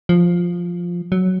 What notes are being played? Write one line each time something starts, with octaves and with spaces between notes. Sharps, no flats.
F3
F#3